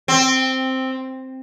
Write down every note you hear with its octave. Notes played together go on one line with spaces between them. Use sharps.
C4